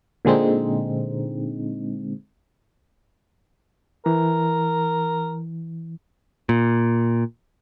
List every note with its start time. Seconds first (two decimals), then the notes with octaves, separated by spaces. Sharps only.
0.25 A#2 D3 G#3 C4 D#4
4.06 E3 A#4
6.49 A#2